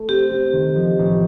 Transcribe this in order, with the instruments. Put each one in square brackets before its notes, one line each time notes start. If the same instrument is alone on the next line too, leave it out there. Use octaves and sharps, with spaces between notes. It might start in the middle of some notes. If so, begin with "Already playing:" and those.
Already playing: [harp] A3
[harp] C4 [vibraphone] G4
[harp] C4
D#3
F3
A1